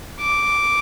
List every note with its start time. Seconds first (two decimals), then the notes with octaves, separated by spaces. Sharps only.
0.21 D6